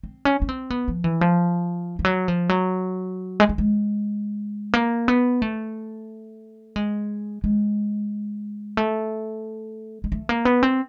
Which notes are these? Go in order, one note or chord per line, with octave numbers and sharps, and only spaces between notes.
C4
C#4
C#4
C4
B3
F3
E3
F3
F3
F#3
F3
F#3
G#3
G3
G#3
A#3
B3
A3
G#3
G#3
A3
G#3
A3
A#3
B3
C4